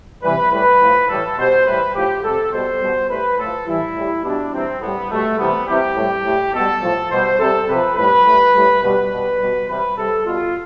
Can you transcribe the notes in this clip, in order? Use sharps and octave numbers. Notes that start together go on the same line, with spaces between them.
C3 E3 G3 B4
A2 G3 B4
A2 F3
A2 E3 G3 A4
B2 G3 C5
A2 E3 G3 B4
A2 F3 G4
C3 G3 A4
B2 G3 C5
B2 G3
A2 G3 B4
A2 F3 A4
A2 E3 G3 E4
A2 G3
B2 G3 D4
C3 E3 G3 C4
A2 G3 B3
B2 G3 A3
C3 E3 G3 B3
C3 E3 G3 G4
A2 G3
A2 G3
B2 G3 A4
A2 F3
B2 G3 C5
C3 G3 A4
C3 F3 B4
A2 G3 B4
A2 G3
A2 G3
B2 G3 B4
B2 G3
B2 G3
C3 E3 G3 B4
C3 G3 A4
B2 G3 F4